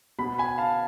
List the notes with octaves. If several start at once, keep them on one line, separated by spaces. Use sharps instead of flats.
B2 B5
G#5 B5
F5 A5